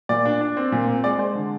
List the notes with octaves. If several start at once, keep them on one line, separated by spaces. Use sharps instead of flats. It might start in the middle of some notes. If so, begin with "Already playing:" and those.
A#2 D5
D4
D4
C4
A#2
C4
G#3 D5
G#3 C5
D3